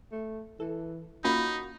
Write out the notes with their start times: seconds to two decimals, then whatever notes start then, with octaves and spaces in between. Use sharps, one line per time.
0.12 A3
0.60 E3 A4
1.25 A#3 C#4 D#4 F4 F#4 B5